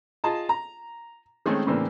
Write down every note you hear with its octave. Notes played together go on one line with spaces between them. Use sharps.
F4 G#4 D#5 A5 A#5
A#5
D#3 G#3 A3 C4 C#4
A2 C#3 E3 A#3 C4 D4